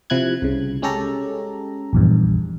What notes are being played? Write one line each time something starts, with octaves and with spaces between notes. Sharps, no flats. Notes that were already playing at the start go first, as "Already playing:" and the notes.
C3 F3 E4 F#6 G#6
C2 C#3
G#3 C#4 G4 A4 A#5
A#1 E2 G2